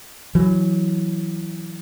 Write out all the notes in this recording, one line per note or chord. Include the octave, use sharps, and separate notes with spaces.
E3 F#3